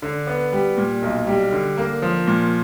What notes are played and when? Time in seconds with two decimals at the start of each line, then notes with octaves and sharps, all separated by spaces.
0.02 D3
0.27 B3
0.53 G3
0.77 A#2
1.02 B1
1.27 G3
1.52 D3
1.78 A#3
2.02 F3
2.28 A#2